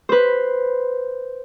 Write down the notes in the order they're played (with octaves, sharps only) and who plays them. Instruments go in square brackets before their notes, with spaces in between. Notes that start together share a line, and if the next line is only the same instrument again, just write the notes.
[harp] B4 C5